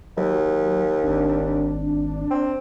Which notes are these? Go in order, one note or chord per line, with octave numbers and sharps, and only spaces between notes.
D#2 F#3
G#1 D4
C4